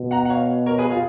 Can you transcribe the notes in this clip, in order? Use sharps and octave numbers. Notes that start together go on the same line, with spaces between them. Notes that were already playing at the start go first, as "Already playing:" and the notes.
Already playing: B2
F#5 A#5
F#5
C#5 F5
A#4 C#5
G#4 B4
F4 G#4